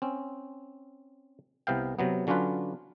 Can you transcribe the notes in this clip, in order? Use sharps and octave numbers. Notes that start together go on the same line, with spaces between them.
C4 C#4
C2 C3 B3 F5 G5
C3 F#3 B3
D3 F#3 C#4 D4 F4 B4